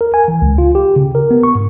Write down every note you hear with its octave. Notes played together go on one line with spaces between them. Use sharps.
A#4
G#5
E3
C#2
F4
G4
C#3
A#4
B3
C#6
G#2